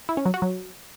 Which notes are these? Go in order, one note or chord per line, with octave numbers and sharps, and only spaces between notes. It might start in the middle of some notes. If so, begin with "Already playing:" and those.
E4
C#4
F#3
F#4
F#3